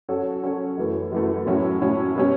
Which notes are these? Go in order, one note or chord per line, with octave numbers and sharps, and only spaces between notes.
F#3 C#4 F#4 A4 C#5
F#3 C#4 F#4 A4 C#5
F#2 E3 A3
F#2 E3 A3
A2 F#3 C#4 E4
A2 F#3 C#4 E4
B2 G3 C#4